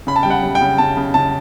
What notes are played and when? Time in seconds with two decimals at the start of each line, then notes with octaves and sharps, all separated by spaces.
0.07 C#3 B5
0.16 A5
0.23 G3 G5
0.30 F#5
0.43 G3
0.55 G5
0.61 C#3
0.78 C#3 A5
0.97 C#3
1.14 C#3 A5